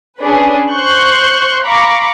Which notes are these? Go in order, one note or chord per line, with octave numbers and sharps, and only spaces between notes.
C#4 D4 G#4 B4
C5 C6 C#6 F#6 G6
F5 A#5 B5 C#6 D6